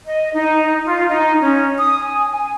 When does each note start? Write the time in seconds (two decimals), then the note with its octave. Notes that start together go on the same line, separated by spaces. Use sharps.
0.05 D#5
0.34 D#4
0.85 F4
1.09 D#4
1.40 C#4
1.78 D#6
2.00 G#5
2.32 G#5